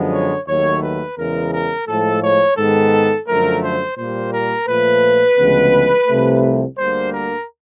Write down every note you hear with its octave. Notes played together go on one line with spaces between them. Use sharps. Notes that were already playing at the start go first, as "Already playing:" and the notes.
Already playing: F#2 D3 F3 G#3 B3
C#5
D#2 D#3 F#3 A3 C#5
B4
E2 C#3 E3 G#3 A#4
A#4
A2 F3 G#3 A4
C#5
G#2 D#3 G#3 B3 A4
F#2 D3 F3 A3 A#4
C5
A#2 G3 A#3 C5
A#4
A#2 F3 A3 B4
D2 C#3 F3 G#3 B3
C2 C3 F3 A3
D2 D3 G3 A#3 C5
A#4